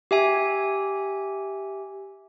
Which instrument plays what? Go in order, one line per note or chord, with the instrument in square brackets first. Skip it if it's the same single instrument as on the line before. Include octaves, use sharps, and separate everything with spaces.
[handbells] G4 E5 G#5